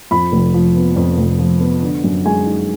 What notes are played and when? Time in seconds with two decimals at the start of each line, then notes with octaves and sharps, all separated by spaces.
0.11 F2 B5
0.32 F1
0.54 F3
0.76 B3
0.96 F2
1.17 F1
1.39 F3
1.60 B3
1.83 D3
2.04 F#2
2.26 G#3 G#5
2.46 D#4